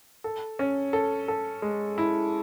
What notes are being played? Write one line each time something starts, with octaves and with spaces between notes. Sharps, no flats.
A4
C#4
A4
A4
G#3
E4